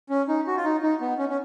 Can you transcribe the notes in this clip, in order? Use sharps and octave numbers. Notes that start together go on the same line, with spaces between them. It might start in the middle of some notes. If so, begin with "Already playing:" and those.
C#4
D#4
F#4
F4
D#4
D#4
B3
C#4
C#4